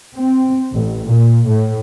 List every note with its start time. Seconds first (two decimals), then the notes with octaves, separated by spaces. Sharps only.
0.17 C4
0.73 A1
1.03 A#2
1.47 A2